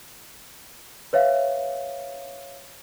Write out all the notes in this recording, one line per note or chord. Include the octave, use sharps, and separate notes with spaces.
B4 C#5 E5 F5